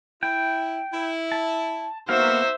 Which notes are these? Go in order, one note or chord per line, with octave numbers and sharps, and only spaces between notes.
E4 G5
E4
A5
A#3 B3 D#4 F#4 C5 E5 F5